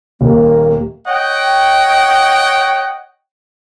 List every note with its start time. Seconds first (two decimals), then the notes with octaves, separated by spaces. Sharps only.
0.21 D#1 A#3
1.08 C#5 D#5 F#5 G5